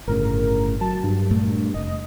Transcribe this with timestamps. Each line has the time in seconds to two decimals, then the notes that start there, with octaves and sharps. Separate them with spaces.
0.08 G1 A2 C#3 A#4
0.81 F#3 A5
1.03 G2
1.31 A#2 A3 A#3
1.74 F1 D#5